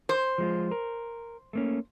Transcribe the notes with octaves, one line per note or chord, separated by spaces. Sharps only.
C5
F3 G#3 F4
A#4
A3 A#3 C#4